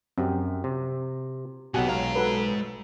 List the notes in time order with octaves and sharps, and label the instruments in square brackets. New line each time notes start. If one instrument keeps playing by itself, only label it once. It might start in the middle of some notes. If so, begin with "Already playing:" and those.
[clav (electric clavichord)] F#2 [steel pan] C4 G4
[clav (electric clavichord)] C3
[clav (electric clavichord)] B1 F#5 G#5 [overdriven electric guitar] B2 B3 [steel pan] F#4 G4
[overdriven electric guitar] G#3 A#5 [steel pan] C#5 F5
[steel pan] F#4 A4 B4